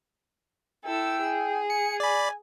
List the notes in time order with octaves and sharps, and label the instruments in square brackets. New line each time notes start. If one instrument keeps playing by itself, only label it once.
[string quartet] E4 A4 E6 [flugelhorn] G5
[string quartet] G#4
[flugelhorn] G#5 [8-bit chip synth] C#7
[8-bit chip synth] D5 B5